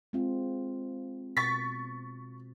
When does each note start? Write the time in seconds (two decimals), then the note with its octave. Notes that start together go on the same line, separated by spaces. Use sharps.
0.13 G#3 C4 F4
1.37 B2 C#6 A6 B6